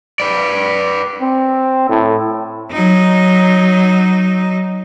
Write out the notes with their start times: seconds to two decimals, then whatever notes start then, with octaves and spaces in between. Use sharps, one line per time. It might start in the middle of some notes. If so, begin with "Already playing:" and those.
0.20 B4 D5
1.21 C4
1.89 A2
2.71 F#3 D#4